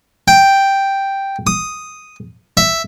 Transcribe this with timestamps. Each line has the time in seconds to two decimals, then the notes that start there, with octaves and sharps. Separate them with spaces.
0.28 G5
1.47 D#6
2.57 E5